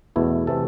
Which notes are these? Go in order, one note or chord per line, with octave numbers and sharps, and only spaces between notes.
E2 B2 A3 E4
C3 E3 A3 A4